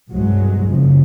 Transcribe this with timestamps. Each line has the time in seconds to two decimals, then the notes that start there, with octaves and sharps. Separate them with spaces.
0.11 C2 G2 B2 F#3 G#3
0.68 F#1 C2 C#3 F3